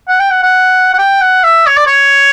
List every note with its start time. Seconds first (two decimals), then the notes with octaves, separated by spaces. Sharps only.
0.08 F#5
0.20 G5
0.31 F#5
0.43 F#5
0.93 F#5
0.99 G5
1.21 F#5
1.44 E5
1.67 C#5
1.77 D5
1.87 C#5